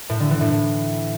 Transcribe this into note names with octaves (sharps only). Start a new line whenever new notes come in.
A2
D3
E3
A2
A2